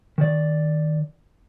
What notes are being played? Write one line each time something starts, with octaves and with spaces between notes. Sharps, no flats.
D#3 D5